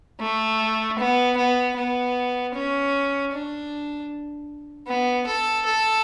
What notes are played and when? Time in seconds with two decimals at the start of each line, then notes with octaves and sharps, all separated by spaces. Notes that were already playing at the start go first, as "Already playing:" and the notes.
0.21 A3
0.99 B3
1.37 B3
1.77 B3
2.55 C#4
3.32 D4
4.87 B3
5.26 A4
5.66 A4